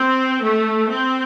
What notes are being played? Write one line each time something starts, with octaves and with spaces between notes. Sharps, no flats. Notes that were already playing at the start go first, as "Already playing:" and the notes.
Already playing: C4
A3
C4